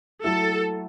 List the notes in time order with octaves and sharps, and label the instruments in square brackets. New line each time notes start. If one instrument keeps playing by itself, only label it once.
[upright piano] F#3 A3 E4 [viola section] A4